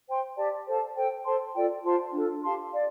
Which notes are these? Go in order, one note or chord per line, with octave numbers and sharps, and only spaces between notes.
C5 G5 C6
G4 D5 A5
A4 C5 F5 A5
A4 C5 G5
A4 C5 A5 C6
F4 A4 D5 G5
F4 C5 A5 C6
D4 F4 A4
G4 F5 A5 C6
D5 F5